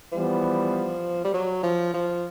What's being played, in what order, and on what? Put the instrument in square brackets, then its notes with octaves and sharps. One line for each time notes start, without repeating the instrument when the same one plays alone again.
[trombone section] E3 G3 B3 [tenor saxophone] F3
[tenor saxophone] G3
F#3
F3
F3